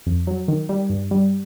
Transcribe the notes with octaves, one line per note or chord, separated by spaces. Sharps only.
F2
F#3
D#3
G3
G2
G3